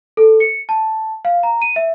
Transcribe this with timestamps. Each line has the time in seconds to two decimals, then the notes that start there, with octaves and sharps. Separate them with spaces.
0.17 A4
0.40 C#7
0.69 A5
1.25 F5
1.43 A#5
1.62 D#7
1.76 E5